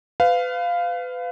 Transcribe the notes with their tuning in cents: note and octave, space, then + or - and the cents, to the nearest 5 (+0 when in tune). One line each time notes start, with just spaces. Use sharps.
B4 +30 F5 +0